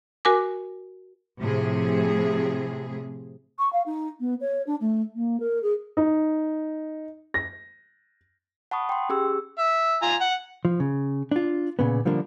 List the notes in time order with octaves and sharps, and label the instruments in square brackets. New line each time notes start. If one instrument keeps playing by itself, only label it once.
[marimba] F#4 A#4 G#5 D6
[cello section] A2 C3 F3 G#4
[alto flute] C#6
F5
D#4
B3
C#5
D4
A3
A#3
A#4
G#4
[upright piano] D#4
A#6
[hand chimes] F#5 A5 B5 C#6 D#6
G5 C6
C#4 G4 G#4 E6
[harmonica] E5
F4 G#5 A#5
F#5
[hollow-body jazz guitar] F3
C#3
D4 F4
A#2 C#3 B3
D3 F3 G3 A#3 D4